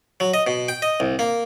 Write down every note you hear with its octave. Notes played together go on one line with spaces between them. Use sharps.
F#3
D#5
B2
G5
D#5
C2
A#3